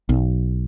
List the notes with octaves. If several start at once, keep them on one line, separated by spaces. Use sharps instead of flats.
B1